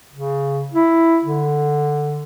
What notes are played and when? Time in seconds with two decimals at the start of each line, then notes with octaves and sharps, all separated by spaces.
0.13 C#3
0.73 E4
1.24 D3